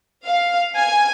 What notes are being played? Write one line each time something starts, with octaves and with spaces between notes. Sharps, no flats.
F5
G#5